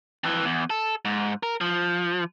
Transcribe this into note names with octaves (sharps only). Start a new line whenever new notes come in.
F2 E3
E2
A4
G#2
A#4
F3